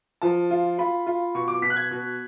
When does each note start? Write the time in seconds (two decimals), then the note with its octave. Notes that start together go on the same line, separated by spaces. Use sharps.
0.22 F3 A5
0.51 F4
0.78 F4 B5
1.07 F4
1.35 B2 C#6
1.48 D6
1.62 B2 B6
1.70 F#6
1.76 G#6
1.91 B2